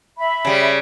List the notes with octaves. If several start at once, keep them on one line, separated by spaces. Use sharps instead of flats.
E5 B5
C#3 G3